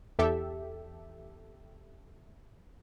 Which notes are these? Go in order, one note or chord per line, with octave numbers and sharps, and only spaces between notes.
E2 G4 A4 E5